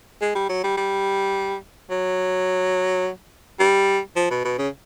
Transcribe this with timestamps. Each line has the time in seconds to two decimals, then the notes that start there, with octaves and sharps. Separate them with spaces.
0.21 G#3
0.35 G3
0.49 F#3
0.63 G3
0.77 G3
1.90 F#3
3.60 G3
4.16 F3
4.31 B2
4.45 B2
4.58 C#3